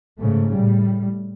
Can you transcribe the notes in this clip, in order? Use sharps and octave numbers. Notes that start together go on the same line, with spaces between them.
G#2 C#3 A3
A2 G3